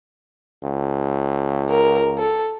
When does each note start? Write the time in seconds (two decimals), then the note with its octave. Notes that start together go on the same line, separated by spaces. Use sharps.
0.63 C#2
1.70 A#4
2.18 A4